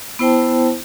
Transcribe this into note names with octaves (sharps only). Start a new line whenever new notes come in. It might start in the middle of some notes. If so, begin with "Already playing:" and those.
B3 E4 C5 G5 A5